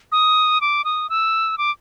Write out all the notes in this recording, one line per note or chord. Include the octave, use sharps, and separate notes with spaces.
D#6
D6
D#6
E6
D6